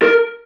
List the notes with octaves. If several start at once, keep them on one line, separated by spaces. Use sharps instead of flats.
A#4